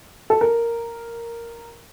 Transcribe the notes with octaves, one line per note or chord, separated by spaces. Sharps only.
A4
A#4